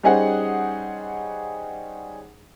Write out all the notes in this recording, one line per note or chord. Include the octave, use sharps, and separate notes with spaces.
G3 C#4 D#4 G#4 C5 F#5